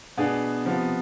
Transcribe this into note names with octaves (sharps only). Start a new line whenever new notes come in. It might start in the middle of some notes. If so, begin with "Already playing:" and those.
B2 B3 D4 G#4
C3 F3 B3